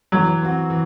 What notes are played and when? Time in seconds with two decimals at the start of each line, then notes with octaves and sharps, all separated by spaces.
0.12 E3 F#3
0.42 C4 F#4
0.70 E3